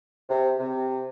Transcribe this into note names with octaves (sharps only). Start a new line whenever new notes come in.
C3
C3